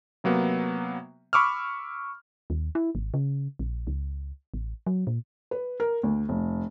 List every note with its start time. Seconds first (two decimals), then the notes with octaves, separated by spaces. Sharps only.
0.24 C3 F#3 A#3 B3
1.33 B5 C#6 D6 E6 F6
2.50 D#2
2.75 E4
2.95 G#1
3.14 C#3
3.59 A#1
3.87 C#2
4.54 A1
4.87 F#3
5.07 A#2
5.51 B4
5.80 A#4
6.03 D2
6.29 F1